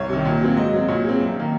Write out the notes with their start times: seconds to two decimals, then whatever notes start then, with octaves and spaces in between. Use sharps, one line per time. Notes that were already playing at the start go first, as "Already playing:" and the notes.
Already playing: C2 C#5
0.09 C3 D#3
0.25 A#2
0.41 F#3 C4
0.56 G#2 D#5
0.73 F#3 C4
0.88 A#2 C#5
1.04 G#3 C4
1.20 F#2
1.36 D#3 A#3